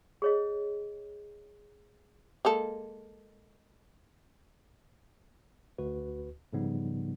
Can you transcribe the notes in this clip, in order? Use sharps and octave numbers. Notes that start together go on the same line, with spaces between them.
G#4 C#5 D#5
G#3 A#3 A4
D2 F#4 B4
G#2 C#3 F3 G3 B3 D#4